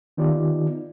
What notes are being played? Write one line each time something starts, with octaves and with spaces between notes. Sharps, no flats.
D#3 B3 D#4 F4 G4 D5